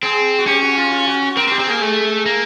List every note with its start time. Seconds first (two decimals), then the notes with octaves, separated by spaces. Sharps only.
0.03 C4 G#4
0.39 F#4
0.47 C#4 G4
0.62 F#4
0.77 F4
0.91 F4
1.07 F#4
1.22 F#4
1.37 C4 A#4
1.48 C4
1.52 G4
1.59 C4
1.67 A#3 G#4
1.82 A3
2.26 A#3